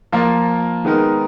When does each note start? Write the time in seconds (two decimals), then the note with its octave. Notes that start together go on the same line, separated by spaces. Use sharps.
0.13 F3 A#3 F4 A#4
0.84 D#3 G#3 B3 D#4 A#4